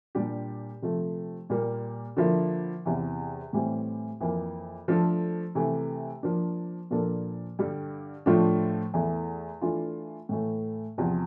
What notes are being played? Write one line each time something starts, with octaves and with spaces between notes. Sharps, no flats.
A#2 G3 D4 G4
C3 F3 A3
A#2 G3 A#3
D3 F3 A#3 E4
E2 C3 E3
A2 E3 G3 C4 G4
F2 E3 A#3
F3 A3 D4 A4
C3 E3 A3
F3 A#3 D4
A#2 F3 A#3 D4 A4
G2 D3 G3
A2 F3 A3 D4 F4
E2 E3 A3
E3 A3 D4 F4
A2 E3 A3
E2 C3 F3